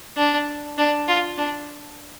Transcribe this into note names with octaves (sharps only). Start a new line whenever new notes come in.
D4
D4
F4
D4